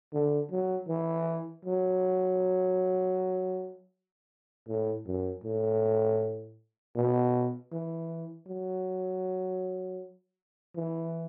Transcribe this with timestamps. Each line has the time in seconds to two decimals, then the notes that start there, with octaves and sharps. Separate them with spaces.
0.13 D3
0.51 F#3
0.88 E3
1.65 F#3
4.68 A2
5.07 F#2
5.44 A2
6.96 B2
7.72 E3
8.47 F#3
10.76 E3